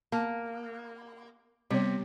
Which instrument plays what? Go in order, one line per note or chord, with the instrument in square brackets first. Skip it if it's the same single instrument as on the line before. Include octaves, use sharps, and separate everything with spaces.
[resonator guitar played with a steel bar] A#3 [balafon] A5
[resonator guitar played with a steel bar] C3 [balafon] G3 B3 C#5